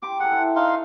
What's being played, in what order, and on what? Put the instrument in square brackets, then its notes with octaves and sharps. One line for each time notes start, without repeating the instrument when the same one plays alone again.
[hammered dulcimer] G4 A#5 C6 [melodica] D6
[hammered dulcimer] G#4 A4 [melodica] F#5
[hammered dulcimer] E4 A4 C5
[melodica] D#4 F5 C6